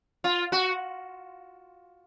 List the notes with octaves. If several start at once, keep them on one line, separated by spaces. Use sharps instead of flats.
F4
F#4